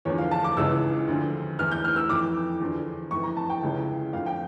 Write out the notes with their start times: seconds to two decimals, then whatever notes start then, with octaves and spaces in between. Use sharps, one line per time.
0.05 E2 D3 F3 C#5
0.18 F5
0.31 A5
0.44 D6
0.57 C#2 C#3 E3 E6
1.08 D2 D3 F3
1.59 E2 E3 F6
1.71 G6
1.84 F6
1.96 E6
2.09 F2 E3 D6
2.60 E2 D3 F3
3.11 F2 E3 C#6
3.23 A#5
3.37 A5
3.50 G5
3.62 C#2 C#3 E3
4.13 F2 D3 F3 F5
4.26 G5